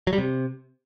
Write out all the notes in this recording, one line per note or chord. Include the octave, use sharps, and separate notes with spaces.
F#3
G3
C3